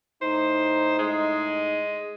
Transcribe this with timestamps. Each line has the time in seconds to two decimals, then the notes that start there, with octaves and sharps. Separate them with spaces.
0.22 A2 D#4 C5
0.99 G#3